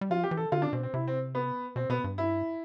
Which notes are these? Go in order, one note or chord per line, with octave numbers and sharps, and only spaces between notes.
G3
F3 F4
G4
E3
A4
D3 F4
D4
B2 C4
C4
C3 E4
C4
B3
B2 C4
B2 B3
G2
E4